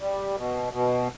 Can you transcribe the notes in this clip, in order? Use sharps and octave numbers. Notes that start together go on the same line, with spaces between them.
G3
B2
B2